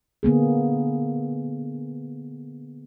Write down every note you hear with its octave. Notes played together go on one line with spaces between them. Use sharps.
D3 A#3 B3 G#4